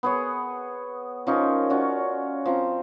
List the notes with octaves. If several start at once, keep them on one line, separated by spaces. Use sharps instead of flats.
B3 G#4 C#5
F3 C#4 D#4 A#4
C#4 F#4 D5
F3 C4 A#5